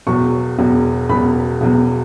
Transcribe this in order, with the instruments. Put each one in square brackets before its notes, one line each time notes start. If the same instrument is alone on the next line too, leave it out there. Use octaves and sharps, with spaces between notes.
[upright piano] E1 E2 B2 F#3 C#6
E1 E2 B2 F#3
E1 E2 B2 F#3 B5
E1 E2 B2 F#3